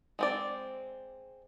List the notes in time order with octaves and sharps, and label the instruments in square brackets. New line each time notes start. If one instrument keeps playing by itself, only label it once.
[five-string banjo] G#3 C4 D5